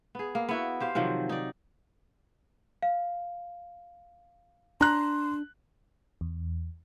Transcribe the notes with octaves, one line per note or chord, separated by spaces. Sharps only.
B3 G#4
A#3
B3 E4 F#4
G4 C5 F5
C3 D#3 F3 F#3
D#4 D5
F5
D4 A#5 C6 F#6
E2